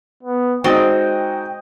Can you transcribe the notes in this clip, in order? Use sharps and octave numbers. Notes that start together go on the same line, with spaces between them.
B3
G#3 C4 D#4 F#4 D5 D#5 G5 C6